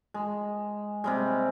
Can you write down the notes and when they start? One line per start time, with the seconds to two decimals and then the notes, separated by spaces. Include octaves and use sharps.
0.14 G#3
1.04 C3 G3 G#3